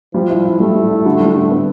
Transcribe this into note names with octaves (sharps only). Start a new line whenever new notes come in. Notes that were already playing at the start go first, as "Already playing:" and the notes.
F3 G3
E4
E4
G3 A3
G3
E4
D3
G3
D3
B3